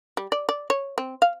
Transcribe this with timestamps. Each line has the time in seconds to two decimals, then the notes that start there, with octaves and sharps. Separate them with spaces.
0.17 G3
0.32 D5
0.49 D5
0.70 C#5
0.98 C4
1.22 F5